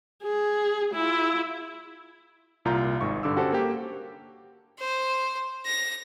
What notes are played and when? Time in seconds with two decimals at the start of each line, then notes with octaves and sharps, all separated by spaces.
0.23 G#4
0.94 E4 F4
2.65 C2 A#2 F4 A#5 G6
3.01 G#1 G#2 C#6
3.23 G2 D3 D6 E6
3.36 C#4 F#4 G4 A4 C5
3.52 A#3 G4
4.80 C5
5.66 A#6